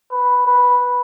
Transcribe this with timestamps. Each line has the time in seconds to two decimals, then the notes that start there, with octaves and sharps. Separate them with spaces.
0.11 B4
0.47 B4